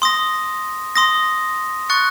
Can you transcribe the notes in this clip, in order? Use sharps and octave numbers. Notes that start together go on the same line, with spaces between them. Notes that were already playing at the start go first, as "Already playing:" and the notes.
C6 D#6 A#6
C6 D#6 A#6
C#6 F#6 A6 C#7